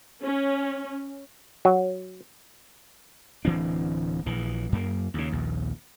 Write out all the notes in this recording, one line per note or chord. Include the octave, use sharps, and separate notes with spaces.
C#4
F#3
D1 E3 C4 D4
A#1 E3
F#2 A#3
D#2 C#3
A#1 D#2